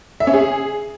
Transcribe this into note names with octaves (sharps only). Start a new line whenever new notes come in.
E5
C#4
G#4